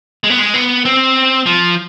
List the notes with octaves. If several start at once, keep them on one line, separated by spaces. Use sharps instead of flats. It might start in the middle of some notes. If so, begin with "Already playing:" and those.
G#3
B3
G#3
B3
C4
F3